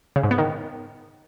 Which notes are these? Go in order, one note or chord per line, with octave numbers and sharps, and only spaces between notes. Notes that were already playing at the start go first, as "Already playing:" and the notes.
C#3
G#2
B3
D#3